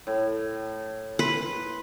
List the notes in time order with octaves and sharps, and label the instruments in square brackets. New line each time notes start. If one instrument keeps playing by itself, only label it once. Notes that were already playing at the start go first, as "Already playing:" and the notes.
[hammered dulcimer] A2
[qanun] B4 [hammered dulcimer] C6